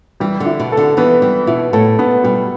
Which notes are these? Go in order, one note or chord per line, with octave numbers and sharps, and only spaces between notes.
E3 G3
D3
E4
B2
A4
D3
E3 B3
E3 G3
B2 E4
A2 A4
B2 B3
B2 G3